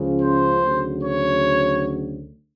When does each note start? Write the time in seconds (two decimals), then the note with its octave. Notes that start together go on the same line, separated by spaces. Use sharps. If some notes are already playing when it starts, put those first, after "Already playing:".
Already playing: C#2 C#3 F3
0.22 C5
0.63 D2 C#3 F#3
1.04 C#5